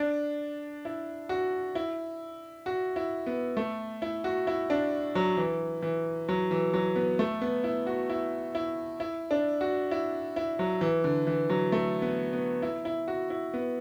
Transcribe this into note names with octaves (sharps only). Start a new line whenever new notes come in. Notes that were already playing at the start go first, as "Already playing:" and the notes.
Already playing: D4
E4
F#4
E4
F#4
E4
B3
A3
E4
F#4
E4
D4
F#3
E3
E3
F#3
E3
F#3
B3
A3
B3
E4
F#4
E4
E4
E4
D4
F#4
E4
E4
F#3
E3
D3
E3
F#3
A3
B3
B3
E4
E4
F#4
E4
B3